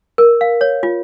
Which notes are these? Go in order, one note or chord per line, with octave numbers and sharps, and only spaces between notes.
A#4
F5
C#5
F4